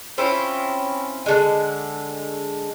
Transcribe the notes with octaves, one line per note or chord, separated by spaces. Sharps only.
C4 C#4 E4 F4
D3 G#3